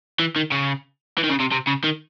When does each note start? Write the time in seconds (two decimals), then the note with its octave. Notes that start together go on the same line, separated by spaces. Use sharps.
0.20 E3
0.36 D#3
0.52 C#3
1.18 E3
1.24 D#3
1.29 C#3
1.40 C3
1.52 C3
1.67 C#3
1.84 D#3